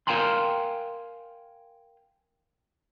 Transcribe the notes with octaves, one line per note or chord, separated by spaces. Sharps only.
A#4 F5 G5 G#5 A#5 C6